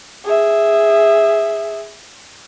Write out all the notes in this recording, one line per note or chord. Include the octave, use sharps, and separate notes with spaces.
G#4 E5